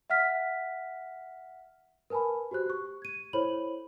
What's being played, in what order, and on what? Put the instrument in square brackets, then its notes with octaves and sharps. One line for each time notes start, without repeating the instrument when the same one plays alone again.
[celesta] E5 F#5 F6 B6
A#4 B4 G#5 A5 B5
F#4 G4 C5 F#6
G4 C#6
G#6 D#7
E4 A4 C5 C#5 B5 F#7